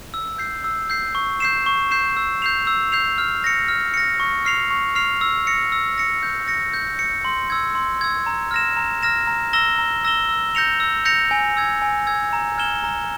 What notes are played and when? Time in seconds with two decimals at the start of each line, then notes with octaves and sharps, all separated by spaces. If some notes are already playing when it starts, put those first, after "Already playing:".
0.14 E6
0.38 G6 C7
0.64 E6
0.90 G6 C7
1.15 C#6
1.40 G6 C7 E7
1.66 C#6
1.91 G6 C7 E7
2.17 E6
2.42 G6 C7 F7
2.67 E6
2.92 G6 C7 F7
3.18 F6
3.44 A#6 C#7
3.68 F6
3.94 A#6 C#7
4.20 C#6
4.45 F6 C7 F7
4.71 C#6
4.95 F6 C7 F7
5.21 E6
5.47 A#6 C#7
5.72 E6
5.98 A#6 C#7
6.23 G6
6.48 A#6 C#7
6.74 G6
6.99 A#6 C#7
7.25 C6
7.50 E6 G#6
7.75 C6
8.01 E6 G#6
8.26 A#5
8.51 F6 A#6 E7
8.77 A#5
9.03 F6 A#6 E7
9.27 A#5
9.53 E6 A#6 E7 G7
9.78 A#5
10.04 E6 A#6 E7 G7
10.29 E6
10.55 G6 A#6 C#7 F7
10.80 E6
11.05 G6 A#6 C#7 F7
11.31 G#5
11.57 E6 G#6
11.82 G#5
12.07 E6 G#6
12.33 A#5
12.58 F6 G#6 E7 G7
12.84 A#5